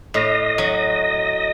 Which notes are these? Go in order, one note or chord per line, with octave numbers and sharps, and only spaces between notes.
A2 D#5
F#3